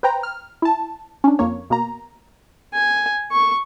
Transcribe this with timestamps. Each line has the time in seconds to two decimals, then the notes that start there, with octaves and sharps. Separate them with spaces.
0.03 B4 C5 G5 A#5
0.23 F6
0.62 E4 A5
1.24 C#4 D4
1.39 F2 F3 A#3 C#5
1.70 B2 A#3 A#5
2.74 G#5
3.32 C#6